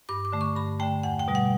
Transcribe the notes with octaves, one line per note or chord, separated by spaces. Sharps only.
G2 D6
D6
D3 A3
C#6
G2 B5
D3 A3 G5
E2 F#5
G5
B2 G3
F#5